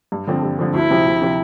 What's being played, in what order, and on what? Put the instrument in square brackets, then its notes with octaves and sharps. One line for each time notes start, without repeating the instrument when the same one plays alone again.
[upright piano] G2
D3 F3 C4
G2
D3 F3 C4
[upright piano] D2 [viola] E4
[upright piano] C3 F3 C4
D2
C3 F3 C4